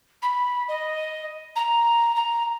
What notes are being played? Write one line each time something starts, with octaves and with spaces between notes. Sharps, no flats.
B5
D#5
A#5
A#5